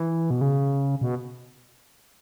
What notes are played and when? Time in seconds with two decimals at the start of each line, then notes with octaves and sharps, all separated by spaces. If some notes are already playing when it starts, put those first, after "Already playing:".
Already playing: E3
0.30 B2
0.41 C#3
1.01 B2